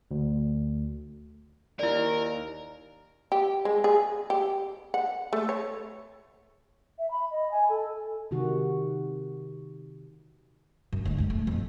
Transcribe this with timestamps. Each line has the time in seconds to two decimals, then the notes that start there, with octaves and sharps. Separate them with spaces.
0.11 D2
1.79 D#2 E4 A#4 D5
3.32 G4
3.65 G#3
3.84 G#4
4.30 G4
4.94 F#5
5.33 A3
5.49 C#5
6.99 E5
7.11 B5
7.31 D#5
7.51 G#5
7.69 A4
8.31 C3 D#3 F#4
10.93 F#2
11.06 D2 G#3
11.18 F#2 C#3
11.30 A3
11.47 F2